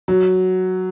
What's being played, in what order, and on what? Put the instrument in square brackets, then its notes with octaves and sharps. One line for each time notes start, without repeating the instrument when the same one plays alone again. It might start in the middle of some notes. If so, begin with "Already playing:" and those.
[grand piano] F#3